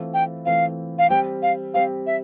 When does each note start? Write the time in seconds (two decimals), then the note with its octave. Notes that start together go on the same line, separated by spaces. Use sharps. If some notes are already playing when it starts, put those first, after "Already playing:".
Already playing: E3 A3 C4 F4
0.14 G5
0.45 E3 A3 C4 F4 F5
0.98 F5
1.10 G3 C4 G4 G5
1.42 F5
1.74 G3 C4 G4 F5
2.07 E5